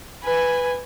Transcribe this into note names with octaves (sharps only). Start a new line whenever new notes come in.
B4 G#5